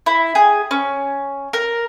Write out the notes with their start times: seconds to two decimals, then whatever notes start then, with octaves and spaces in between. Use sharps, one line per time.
0.06 E4
0.35 G#4
0.71 C#4
1.53 A#4